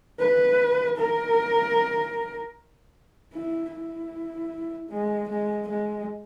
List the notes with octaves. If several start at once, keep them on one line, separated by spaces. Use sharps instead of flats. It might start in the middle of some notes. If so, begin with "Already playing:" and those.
B4
A#4
E4
E4
G#3
G#3
G#3